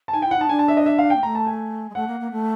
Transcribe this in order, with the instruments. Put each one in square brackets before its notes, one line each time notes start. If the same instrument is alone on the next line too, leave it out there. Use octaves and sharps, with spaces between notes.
[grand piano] A5
[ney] D#4 [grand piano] G#5
[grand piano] G5
[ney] E4
[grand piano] F#5
[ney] D#4 [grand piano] A5
[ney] D4 [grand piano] G#5
[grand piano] A5
E5
D#5
E5
F5
G5
[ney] A#3
[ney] A3 [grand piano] A#5
[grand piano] A5
G#5
[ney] G#3
[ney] A3 [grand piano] F#5
[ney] A#3
A#3
A3